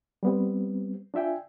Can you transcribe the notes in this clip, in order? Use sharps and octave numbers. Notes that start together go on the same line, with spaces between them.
G3 B3 C4
D4 F4 E5 G5 G#5